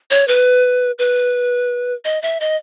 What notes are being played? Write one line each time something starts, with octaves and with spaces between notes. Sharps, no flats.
C#5
B4
B4
D#5
E5
D#5